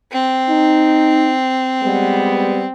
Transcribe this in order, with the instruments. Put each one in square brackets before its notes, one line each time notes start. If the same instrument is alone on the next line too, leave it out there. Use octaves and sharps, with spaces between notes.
[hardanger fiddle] C4
[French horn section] D#4
G3 G#3 B3